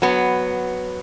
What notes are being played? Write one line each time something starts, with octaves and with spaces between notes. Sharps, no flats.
F#3 B3